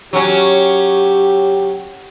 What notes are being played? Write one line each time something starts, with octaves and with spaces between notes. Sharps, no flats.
F#3 C#4 G4